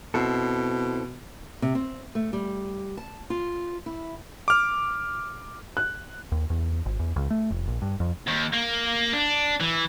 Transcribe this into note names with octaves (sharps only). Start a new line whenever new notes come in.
B2 C4 E4 A4
C3
C4
A3
G3
A5
F4
E4
D6 F6
F#6
D#2
E2
G#1
E2
C#2
A3
F1
A#1
G2
F2
D#2
A#3
D4
E3